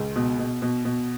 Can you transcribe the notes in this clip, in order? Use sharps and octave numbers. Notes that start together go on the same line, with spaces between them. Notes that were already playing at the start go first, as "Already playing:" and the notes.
Already playing: C#2
B2
B2
B2
B2